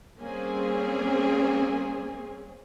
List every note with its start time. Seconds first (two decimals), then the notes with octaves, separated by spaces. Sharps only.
0.18 G3 A#3 C4 C#4 G#4